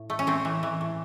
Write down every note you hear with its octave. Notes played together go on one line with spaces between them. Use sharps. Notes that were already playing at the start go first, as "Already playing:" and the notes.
Already playing: A2
A3
C#4
A3 C4
E3
E3
A2